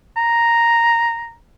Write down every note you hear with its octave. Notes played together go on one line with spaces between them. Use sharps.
A#5